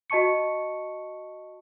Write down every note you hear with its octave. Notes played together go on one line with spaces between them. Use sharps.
F#4 D#5 A5 C#6 C#7